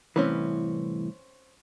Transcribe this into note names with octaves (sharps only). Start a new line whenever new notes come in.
C2 A2 E3 C4 C#4 B4